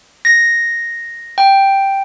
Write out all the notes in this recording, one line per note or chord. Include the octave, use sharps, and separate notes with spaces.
A#6
G5